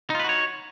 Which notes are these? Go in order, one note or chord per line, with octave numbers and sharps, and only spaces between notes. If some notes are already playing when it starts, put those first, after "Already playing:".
D#4 F4 F#4 B4 C#5